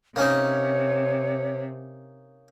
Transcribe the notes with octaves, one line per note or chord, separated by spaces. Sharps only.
C3 A#3 C#4 D#4 C#5